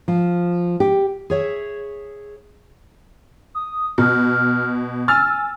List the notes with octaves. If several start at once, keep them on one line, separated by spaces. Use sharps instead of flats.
F3
G4
G#4 C#5 E5
D#6
B2 F6
G#5 E6 F6 A6